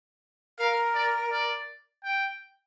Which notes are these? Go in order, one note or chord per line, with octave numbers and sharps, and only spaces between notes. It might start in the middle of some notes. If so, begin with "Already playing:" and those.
A#4 F5
D5
D5
G5